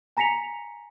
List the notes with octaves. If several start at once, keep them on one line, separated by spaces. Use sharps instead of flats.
G#5 A#5 A#6 B6 C#7 F7